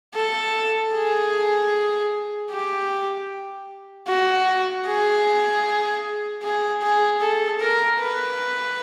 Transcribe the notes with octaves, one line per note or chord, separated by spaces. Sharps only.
A4
G#4
G4
F#4
G#4
G#4
G#4
A4
A#4
B4